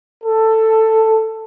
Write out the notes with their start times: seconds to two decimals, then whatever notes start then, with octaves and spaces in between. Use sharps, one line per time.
0.24 A4